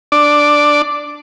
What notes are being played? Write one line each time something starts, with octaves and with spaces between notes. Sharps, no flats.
D4 D5